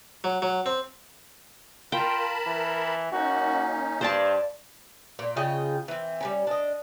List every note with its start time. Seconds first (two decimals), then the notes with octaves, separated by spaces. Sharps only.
0.24 F#3
0.42 F#3
0.66 C4
1.92 F4 A#4 G5 A5 B5
2.46 E3
3.12 A#3 C#4 D#4 F#4
4.01 G2 C5 D5 A5
5.19 A#2 A#3
5.37 C#3 F4 D#5 G5
5.88 E3 C4
6.21 G3 B3 C#4
6.47 D4 D#5